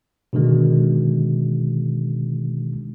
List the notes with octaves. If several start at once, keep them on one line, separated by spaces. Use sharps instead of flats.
B2 D3 D#3 G#3